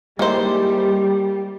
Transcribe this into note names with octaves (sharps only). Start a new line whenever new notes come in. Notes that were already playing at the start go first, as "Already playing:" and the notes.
D#3 G3 G#3 A#3 E4 G4 C5